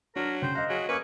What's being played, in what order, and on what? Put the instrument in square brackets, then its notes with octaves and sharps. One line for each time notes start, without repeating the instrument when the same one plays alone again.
[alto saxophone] F#3 [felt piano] D4 [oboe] A#4
[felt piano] C#3 [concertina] C5 [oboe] G5
[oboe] A#4 [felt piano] D#5 F5 F#6
[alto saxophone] F#3 [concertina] G#4
[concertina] A#3 C#4 C#6 [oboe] G#4 [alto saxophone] B4